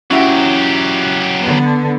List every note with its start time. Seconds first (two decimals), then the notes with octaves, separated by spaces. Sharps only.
0.11 F#3 C#4 E4 F#4 G4
1.42 D3 B3